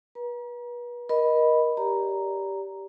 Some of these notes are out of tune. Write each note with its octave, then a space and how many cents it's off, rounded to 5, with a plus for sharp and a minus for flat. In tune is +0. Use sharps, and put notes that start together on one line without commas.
B4 -35 A#5 +30
A#4 +30 D#5 +0 B5 +0
G4 +0 D5 -35 A#5 +0